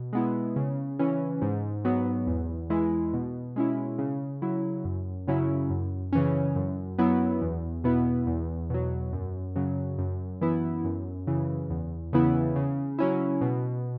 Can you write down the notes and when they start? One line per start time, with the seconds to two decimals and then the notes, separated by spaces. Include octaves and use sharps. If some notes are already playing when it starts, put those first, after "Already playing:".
Already playing: B2
0.13 G#3 B3 E4
0.56 C#3
0.99 E3 C#4
1.42 G#2
1.85 F#3 B3
2.27 E2
2.70 E3 G#3 E4
3.13 B2
3.56 G#3 C#4 E4
3.98 C#3
4.42 F#3 E4
4.85 F#2
5.28 C#3 F#3 C#4 E4
5.70 F#2
6.13 C#3 E3 C#4
6.56 F#2
6.98 F#3 B3 E4
7.41 E2
7.84 B2 B3 E4
8.27 E2
8.70 B2 F#3
9.13 F#2
9.56 C#3 F#3
9.98 F#2
10.41 E3 B3 E4
10.84 F#2
11.27 C#3 E3
11.70 E2
12.13 C#3 E3 B3 E4
12.56 C#3
12.99 F#3 C#4 E4
13.41 B2